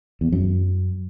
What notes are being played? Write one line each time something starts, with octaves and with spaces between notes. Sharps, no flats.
E2
F#2